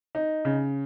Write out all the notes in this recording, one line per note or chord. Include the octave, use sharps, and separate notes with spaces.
D#4
C#3